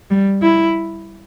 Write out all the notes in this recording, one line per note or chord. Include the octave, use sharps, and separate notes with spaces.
G3
E4